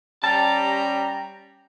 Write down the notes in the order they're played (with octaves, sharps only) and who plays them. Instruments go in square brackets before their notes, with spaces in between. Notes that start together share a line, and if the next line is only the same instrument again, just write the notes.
[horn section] G3 C#4 G4 [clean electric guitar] A5 [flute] A#5